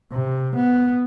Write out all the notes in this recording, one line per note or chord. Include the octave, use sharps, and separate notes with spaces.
C3
B3